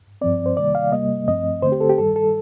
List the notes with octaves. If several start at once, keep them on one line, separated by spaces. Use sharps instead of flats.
G2 F3 C4 D5
C5
C3 D#3 G3 A#3 D5
F5
C3 G3 A#3 D#5
G2 F3 A3 C4 D#5
D3 A3 C4 C5
G4
A4
G4
G2 D#3 G3 A4
A4